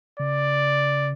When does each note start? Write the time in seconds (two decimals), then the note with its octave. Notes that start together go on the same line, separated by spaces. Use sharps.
0.20 C#3 D5